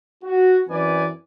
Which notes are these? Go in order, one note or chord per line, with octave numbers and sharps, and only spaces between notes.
F#4
F#2 E3 C4 B4 D5 G#5